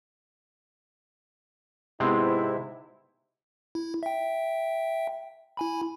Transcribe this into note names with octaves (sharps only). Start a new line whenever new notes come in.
G#2 C3 G#3 B3 C4 E4
E4
E5 G5
E4 G#5 B5